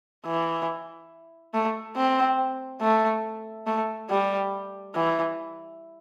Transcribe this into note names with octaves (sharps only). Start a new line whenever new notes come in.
E3
A3
C4
A3
A3
G3
E3